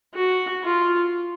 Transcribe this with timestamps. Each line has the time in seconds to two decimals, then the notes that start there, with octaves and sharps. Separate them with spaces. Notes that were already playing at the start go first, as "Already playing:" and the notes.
0.14 F#4
0.64 F4